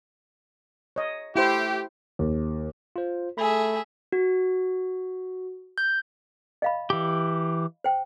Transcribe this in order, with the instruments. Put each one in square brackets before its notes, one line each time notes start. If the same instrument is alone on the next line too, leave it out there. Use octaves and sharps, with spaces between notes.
[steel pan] C#5 D#5
[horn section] A3 G4 [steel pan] E4 C5
[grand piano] D#2
[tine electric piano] F4 C5
[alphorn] A3 [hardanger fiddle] G#4 E5 [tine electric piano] B5
[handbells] F#4
G6
[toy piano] D#5 F5 B5
[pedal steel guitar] E3 G4
[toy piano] C5 G5